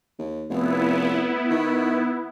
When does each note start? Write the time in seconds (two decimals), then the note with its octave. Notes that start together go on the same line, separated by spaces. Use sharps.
0.19 D#2
0.50 F1 B3 E4
1.50 D#3